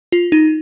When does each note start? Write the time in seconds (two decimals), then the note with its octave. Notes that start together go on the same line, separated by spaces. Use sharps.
0.12 F4
0.32 D#4